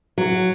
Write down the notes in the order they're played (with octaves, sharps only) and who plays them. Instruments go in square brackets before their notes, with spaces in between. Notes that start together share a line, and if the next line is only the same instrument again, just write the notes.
[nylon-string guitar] F#3